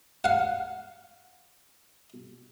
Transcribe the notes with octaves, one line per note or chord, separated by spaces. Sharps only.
F5 F#5